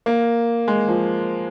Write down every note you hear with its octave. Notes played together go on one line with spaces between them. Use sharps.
A#3
G#3
F3